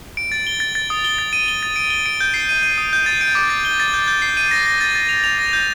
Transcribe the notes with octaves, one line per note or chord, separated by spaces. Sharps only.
D7
A6
G7
A6
A6
D#6
G7
A6
D#7
G7
A6
D7
G7
D7
G6
C7
D#7
D#7
D#6
G6
A6
D7
D6
A6
G7
A6
G6
G6
C7
D#7
A#6
A#6
A6
A6
F7
F7
A#6
G6